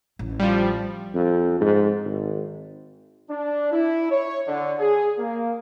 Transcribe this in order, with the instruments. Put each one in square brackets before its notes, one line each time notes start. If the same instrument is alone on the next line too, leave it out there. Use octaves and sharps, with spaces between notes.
[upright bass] A1
[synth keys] F3 G3
[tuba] F2
G#2
G#1
[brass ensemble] D4
E4
C#5
D3
G#4
A#3